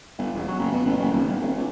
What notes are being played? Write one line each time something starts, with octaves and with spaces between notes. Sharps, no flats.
G1
E1
F#3
F#1
B2
A1
F#1
D#1
G1
G#1
C#2